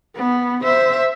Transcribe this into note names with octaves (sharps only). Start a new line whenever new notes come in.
B3
C5 E5